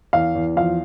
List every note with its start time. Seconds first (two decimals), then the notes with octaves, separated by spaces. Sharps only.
0.13 E2 F5
0.35 E2
0.56 F3 F5